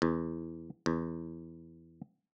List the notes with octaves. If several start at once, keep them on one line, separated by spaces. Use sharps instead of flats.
E2
E2